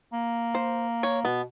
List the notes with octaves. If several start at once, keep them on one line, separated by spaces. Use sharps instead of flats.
A#3
C5
C#5
B2 B3